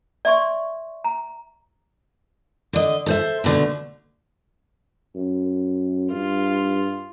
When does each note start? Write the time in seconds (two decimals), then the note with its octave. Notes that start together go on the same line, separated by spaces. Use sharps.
0.25 D5 E5 C6 C#6
1.04 A#5
2.73 D3 D#5
3.06 A4 C5 E5
3.44 B2 D3 A3
5.16 F#2
6.12 G2 F4